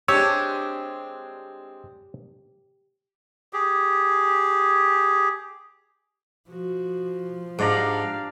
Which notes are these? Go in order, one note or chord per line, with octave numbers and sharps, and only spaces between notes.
G#3 C4 D4 G4 C#5 E6
G4 G#4
F3 F#4
G#2 D4 G4 D5 F5 A#5